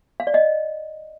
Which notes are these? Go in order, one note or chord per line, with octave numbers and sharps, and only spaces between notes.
F5
D5
D#5